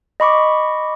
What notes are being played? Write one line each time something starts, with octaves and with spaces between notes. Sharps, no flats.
D#5 B5 C#6 D6